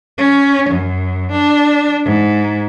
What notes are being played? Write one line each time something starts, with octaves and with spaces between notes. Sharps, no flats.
C#4
F#2
D4
G#2